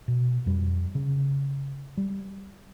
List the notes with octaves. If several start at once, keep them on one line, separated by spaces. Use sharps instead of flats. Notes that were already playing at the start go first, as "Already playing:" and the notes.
B2
F2 G3
C#3
G3